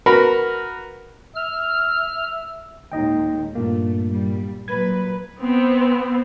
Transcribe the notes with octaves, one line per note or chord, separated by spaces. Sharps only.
F#4 A#4 B4 B5
E5 F6
D#2 A#2 G#3 D#4 D#5 G5
G2 A#2 A3 A#3
G3
A#2 F#3 B4 G#6
B3 C4